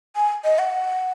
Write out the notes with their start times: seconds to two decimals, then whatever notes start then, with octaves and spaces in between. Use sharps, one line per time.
0.16 G#5
0.44 D#5
0.58 F#5